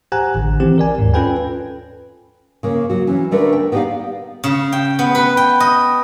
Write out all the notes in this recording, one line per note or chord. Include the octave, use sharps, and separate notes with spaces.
G4 C5 F#5 G#5 A#5 F#6
A1 D3
D#3 E3 C4 G4
A#4 D5 G#5
D#2 G#2
C#4 F4 A4 B4 G5 G#5
C#3 A#3
F#3 F#4
E3 C#4
D3 A3 D4 A#4 B4
G5
B3 D#4 G4 C5 D5 F5
C#3
G5
B3
B4
G5
D#5